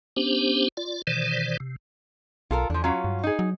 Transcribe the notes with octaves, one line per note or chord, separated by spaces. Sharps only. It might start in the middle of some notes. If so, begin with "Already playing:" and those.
B3 C#4 D4 G4 C5
F4 D5
B2 D#3 E3 C5 D5
C3
B1 F4 A4 A#4
E2 F3 D4
F#3 C#4 F4
G2
D#4 G#4
F#3